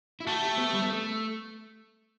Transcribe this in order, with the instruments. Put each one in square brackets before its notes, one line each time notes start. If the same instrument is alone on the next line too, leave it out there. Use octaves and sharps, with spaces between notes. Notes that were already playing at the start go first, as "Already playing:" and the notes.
[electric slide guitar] E4
[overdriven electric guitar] A3 [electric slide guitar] F#4
[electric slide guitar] G4
B3
G3
B3
A3